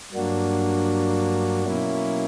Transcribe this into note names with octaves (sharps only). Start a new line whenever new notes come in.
G2 F#3 A#3 D4 F#4
B2 F#3 A#3 C#4 E4